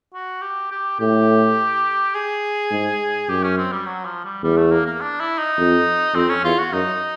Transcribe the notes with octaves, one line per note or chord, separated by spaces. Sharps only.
F#4
G4
G4
A2 G4
G#4
G#2
F#2 G4
C#4
C4
G3
F#3
F3
G3
E2 G3
A3
A#3
A#3
D4
E4
D#4
F2
F2 C4
C#4
E2 F4
F#4
F#2 D#4